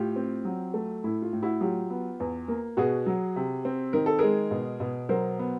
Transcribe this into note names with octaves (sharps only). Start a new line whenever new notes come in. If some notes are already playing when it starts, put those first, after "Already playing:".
Already playing: A2 F4 G4
C4
F#3
A3
A2 E4
F4
A2
E4 F#4
F#3 F4 G4
B3
E2
A#3
B2 F#4 G#4
F#3
C3
C4
D#3 A#4
A4
G#3 G#4 A#4
B2
B2
F#3 A#4 C5
B3